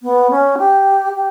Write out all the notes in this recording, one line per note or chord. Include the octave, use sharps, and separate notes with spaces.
B3
C#4
G4
G4